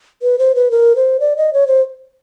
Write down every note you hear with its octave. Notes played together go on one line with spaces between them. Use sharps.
B4
C5
B4
A#4
C5
D5
D#5
C#5
C5